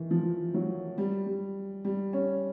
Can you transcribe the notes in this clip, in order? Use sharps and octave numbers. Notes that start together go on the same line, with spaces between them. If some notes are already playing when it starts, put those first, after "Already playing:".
Already playing: D#3 E3
F3
F#3
G3
G3
G3
C#4